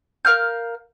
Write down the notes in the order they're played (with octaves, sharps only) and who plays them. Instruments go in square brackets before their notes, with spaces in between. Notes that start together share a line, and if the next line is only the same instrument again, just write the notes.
[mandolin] A#4 F5 F6 G6